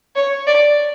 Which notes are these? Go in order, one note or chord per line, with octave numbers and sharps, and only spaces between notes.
C#5
D5